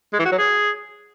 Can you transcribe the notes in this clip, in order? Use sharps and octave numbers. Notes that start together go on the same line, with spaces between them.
G#3
E3
F#4
F#3
G#4